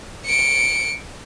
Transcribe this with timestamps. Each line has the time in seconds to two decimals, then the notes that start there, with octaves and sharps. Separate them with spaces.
0.25 C#7 D7